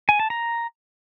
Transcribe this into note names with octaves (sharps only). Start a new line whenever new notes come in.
G#5
A5
A#5